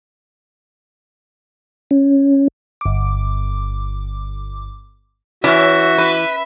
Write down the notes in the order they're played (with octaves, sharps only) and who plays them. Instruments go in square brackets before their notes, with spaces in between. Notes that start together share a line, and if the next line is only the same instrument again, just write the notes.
[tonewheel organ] C#4
[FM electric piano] G1 D6
[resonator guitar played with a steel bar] E3 [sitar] C#4 [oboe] F#4 [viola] E5
[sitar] B4